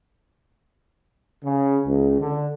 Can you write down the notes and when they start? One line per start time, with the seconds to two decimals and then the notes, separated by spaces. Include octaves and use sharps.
1.43 C#3
1.87 C#2
2.20 D3